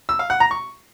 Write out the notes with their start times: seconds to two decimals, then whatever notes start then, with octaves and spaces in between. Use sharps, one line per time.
0.09 E6
0.19 F5
0.30 F#5
0.40 A#5
0.51 C#6